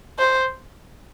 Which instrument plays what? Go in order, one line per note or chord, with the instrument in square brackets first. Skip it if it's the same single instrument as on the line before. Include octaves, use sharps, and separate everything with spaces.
[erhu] C5